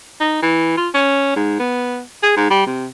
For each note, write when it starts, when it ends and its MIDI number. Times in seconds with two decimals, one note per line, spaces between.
0.20 0.38 63
0.42 0.75 52
0.77 0.88 65
0.94 1.36 61
1.36 1.55 44
1.59 2.01 59
2.23 2.32 68
2.36 2.49 44
2.50 2.65 55
2.66 2.87 48